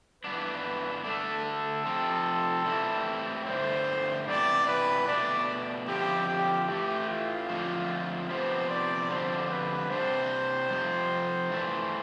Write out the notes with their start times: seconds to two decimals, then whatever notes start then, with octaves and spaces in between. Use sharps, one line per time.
0.24 G2 E3 B3 D4 B4
1.04 D3 A3 D4 A4
1.44 A4
1.85 C3 F3 C4
2.65 A2 E3 G3 C4 E4
3.45 G2 D3 A3 E4 C5
4.26 C3 E3 B3 E4 D5
4.67 B4
5.07 B2 A3 D4 D5
5.87 F2 D3 F3 C4 E4 G4
6.27 G4
6.68 A2 E3 A3 G4
7.09 F4
7.49 F2 D3 F3 A3
8.29 C3 F3 B3 C5
8.70 D5
9.10 F2 D3 G3 C5
9.50 B4
9.90 C3 G3 D4 C5
10.71 F2 C3 F3
11.51 G2 E3 A3 D4